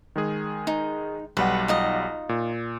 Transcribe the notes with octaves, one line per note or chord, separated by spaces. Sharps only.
D#3 G#3 G#4
D#4
B1 G3 B4 F#5
D#4 F4 D#5
A#2